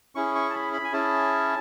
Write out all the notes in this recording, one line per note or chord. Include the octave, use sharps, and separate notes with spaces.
C#4 E4 G#4 C#6
C#6
A5
B5
B5
G#5
C#4 E4 G#4 A5